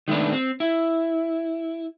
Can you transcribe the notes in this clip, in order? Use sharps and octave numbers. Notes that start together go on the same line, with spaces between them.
D#3 G#3 A3 B3 D4
C4
E4